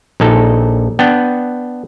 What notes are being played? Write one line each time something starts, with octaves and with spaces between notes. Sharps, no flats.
A#1 D#4 A4
B3 D4 G5